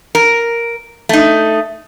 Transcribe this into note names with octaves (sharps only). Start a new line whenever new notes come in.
A#4
A3 D#4